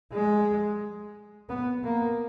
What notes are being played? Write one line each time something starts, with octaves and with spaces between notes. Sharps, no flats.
G#3
B3
A#3